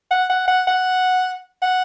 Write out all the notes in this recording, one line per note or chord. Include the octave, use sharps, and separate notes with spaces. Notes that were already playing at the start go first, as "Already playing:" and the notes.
F#5
F#5
F#5
F#5
F#5